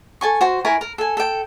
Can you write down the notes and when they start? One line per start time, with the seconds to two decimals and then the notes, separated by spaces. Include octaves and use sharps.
0.21 A4 G#5 C#6
0.41 F#4 C5
0.65 E4 A#4 G#5 C#6
0.81 A#4
0.98 A4 G#5
1.17 A4 G5